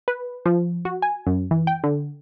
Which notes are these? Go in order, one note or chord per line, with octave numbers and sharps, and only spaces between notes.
B4
F3
F#4
G#5
F#2
E3
G5
D3